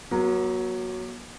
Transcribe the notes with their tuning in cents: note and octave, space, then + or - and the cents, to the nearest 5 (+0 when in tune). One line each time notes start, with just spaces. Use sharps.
F#3 +0 A#3 +45